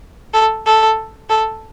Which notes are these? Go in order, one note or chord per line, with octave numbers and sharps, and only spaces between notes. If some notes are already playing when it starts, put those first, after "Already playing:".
A4
A4
A4